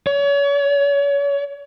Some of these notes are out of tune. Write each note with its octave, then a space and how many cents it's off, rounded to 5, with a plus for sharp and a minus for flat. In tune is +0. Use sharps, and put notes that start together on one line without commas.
C#5 +35